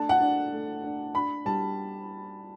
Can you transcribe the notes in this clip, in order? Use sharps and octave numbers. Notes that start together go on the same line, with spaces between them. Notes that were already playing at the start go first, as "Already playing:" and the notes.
Already playing: A3 D4 A5
F#5
D4
A3
D4
D4 B5
G3 A5